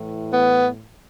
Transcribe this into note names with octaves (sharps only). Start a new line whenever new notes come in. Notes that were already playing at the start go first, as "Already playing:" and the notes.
Already playing: A2 E3
B3